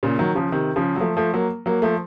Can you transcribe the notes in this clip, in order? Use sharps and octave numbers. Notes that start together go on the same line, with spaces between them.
A#2 C#3
D#3 F#3
C#3 F3
C3 D#3
C#3 F3
F#3
F3 A3
F3 A3
F#3 A#3
F#3 A#3
F3 A3